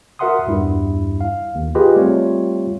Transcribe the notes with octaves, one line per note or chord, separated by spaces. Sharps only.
F#4 A#4 E5 F#5 C6 D#6
E2 G2 E4
F5
D#2
F4 G4 G#4 B4 D#5
G3 A3 C4 F4 C#5